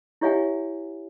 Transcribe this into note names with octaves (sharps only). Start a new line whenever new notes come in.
E4 G4 C#5 E5 F#5 G#5